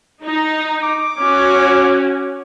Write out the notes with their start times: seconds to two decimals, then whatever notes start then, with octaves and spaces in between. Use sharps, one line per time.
0.24 D#4
0.83 D6
1.18 C#4 F#4